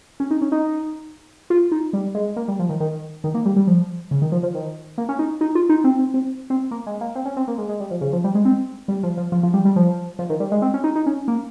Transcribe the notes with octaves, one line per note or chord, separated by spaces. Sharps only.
C#4
D#4
C#4
D#4
F4
D#4
G3
G#3
A#3
G3
F3
D#3
D#3
D#3
A#3
G3
G3
F3
C#3
D#3
F3
F3
D#3
A#3
C#4
D#4
D#4
F4
D#4
C4
C4
C4
C4
A#3
G#3
A#3
C4
C#4
C4
A#3
G#3
G#3
G3
F3
C#3
F3
G3
G#3
C4
G3
F3
F3
F3
F3
G3
G3
F3
F3
D#3
G3
G#3
C4
C#4
D#4
D#4
C#4
A#3